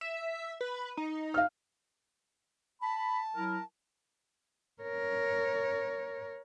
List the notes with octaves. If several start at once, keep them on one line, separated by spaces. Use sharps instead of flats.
E5
B4
D#4
F5 F6
A5 B5
F#3 E4 A#4
A#4 C#5